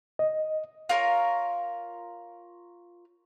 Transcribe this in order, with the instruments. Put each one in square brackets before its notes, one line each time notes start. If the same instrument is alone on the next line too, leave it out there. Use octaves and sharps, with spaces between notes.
[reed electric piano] D#5
[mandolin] F4 A#4 C#5